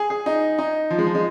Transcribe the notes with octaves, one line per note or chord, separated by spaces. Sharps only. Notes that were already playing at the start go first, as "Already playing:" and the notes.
Already playing: G#4
G#4
D#4
D#4
F3
G#3
F3
G#3